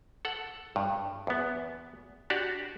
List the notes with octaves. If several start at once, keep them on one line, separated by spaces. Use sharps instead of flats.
A4 F#5
G2
E2 B3
D4 F#4 G4 D5